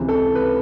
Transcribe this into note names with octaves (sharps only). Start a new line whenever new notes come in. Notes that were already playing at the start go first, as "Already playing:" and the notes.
Already playing: C#2 C3 E3 G#3
A4
B4